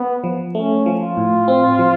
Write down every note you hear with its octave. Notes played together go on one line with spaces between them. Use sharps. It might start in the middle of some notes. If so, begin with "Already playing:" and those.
Already playing: B3
F3
A3 C#4
F3
F4
A2
C4
F3